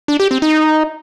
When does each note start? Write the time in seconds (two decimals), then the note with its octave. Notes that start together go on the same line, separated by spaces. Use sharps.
0.08 D4
0.20 G4
0.31 C4
0.42 D#4